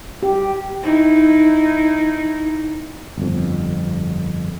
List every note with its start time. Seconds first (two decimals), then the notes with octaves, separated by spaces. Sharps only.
0.23 G4
0.83 D#4 E4
3.17 G1 F2